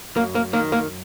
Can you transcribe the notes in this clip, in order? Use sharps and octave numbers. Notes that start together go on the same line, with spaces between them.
F#2 A#3
A#3
D#3 A#3
A#3